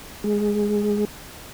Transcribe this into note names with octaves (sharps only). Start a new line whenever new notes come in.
G#3 G#4